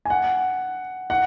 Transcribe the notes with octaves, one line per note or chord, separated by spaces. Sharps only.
G#5
F#5
F#5